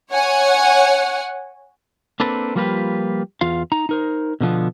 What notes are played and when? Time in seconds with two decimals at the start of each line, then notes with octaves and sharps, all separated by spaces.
0.11 C#5 F#5 G#5
2.20 A#3 C4 D4 A4 B4
2.55 F3 G3 A#3 F4 G4 B4
3.41 E2 F4 F5
3.72 D#4 A#5
3.89 D#4 A#4 C5
4.40 B2 D3 F3 B3